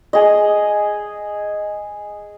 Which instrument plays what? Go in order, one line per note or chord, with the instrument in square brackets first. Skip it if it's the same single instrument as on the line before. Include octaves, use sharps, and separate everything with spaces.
[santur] G#4 D#5